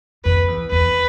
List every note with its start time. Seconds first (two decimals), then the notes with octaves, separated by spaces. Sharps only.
0.25 F2 B4
0.48 E2
0.71 E2 B4